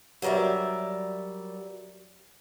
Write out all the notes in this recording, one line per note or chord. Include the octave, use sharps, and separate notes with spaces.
F#3 G3 A#4 D5 E5